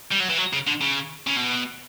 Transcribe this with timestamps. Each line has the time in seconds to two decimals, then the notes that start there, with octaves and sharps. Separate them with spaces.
0.12 G3
0.21 F#3
0.30 E3
0.38 F#3
0.53 C#3
0.67 D3
0.81 C#3
1.27 C#3
1.36 B2